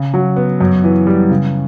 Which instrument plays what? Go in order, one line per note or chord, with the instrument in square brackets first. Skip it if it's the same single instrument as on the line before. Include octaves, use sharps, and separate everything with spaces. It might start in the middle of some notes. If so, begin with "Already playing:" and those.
Already playing: [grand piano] C#3
F#3
B3
F#2
E3
G3
C#3